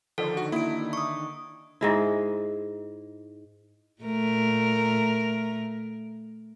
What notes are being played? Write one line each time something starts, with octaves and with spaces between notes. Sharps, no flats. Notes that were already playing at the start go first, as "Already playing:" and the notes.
D3 D#3 F3 A4
F#4
A#3 E4 D7
C#6 D#6
G#2 G#3 E4
A#2 A3 A#4